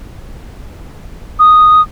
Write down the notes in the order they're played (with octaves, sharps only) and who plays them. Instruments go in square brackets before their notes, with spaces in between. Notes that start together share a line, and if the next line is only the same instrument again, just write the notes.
[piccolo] D#6